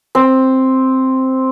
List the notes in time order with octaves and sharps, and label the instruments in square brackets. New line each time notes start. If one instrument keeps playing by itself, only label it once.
[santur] C4